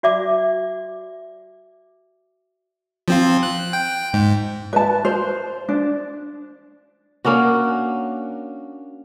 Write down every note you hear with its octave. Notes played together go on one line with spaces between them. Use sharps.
F#4 D5 E5 D6
F3 C4 F4
F#6
G5
G#2
B4 A5
C5
D4
A#3 C#4 D4 F#4